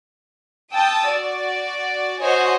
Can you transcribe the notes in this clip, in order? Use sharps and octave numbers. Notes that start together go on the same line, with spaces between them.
G5 A5 D#6 E6 A6
F#4 D5
F#4 C5 C#5 D#5 G#5